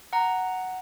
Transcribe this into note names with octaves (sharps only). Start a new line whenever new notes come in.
F#5 A#5